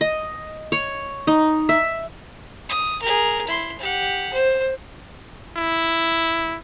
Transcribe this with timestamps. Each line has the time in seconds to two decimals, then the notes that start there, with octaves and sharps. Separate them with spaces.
0.01 D#5
0.72 C#5
1.27 D#4
1.69 E5
2.69 D#6
3.02 G#4 A#4
3.47 E4 C6
3.79 G4 F#5
4.33 C5
5.57 E4